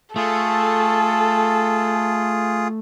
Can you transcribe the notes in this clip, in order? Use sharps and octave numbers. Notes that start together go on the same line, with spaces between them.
A3 F4 G#4 A4